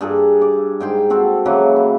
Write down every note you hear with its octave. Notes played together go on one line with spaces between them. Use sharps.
G2 G#4 A4 A#5
D6
G#2 G5 C6
C4 F#4 A4
C#3 E3 F#3 A#3
E4